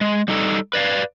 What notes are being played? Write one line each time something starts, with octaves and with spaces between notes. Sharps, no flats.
G#3
G3 D#4 A4
B4 D5 F5